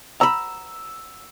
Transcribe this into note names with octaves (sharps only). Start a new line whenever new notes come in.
A#5 B5 E6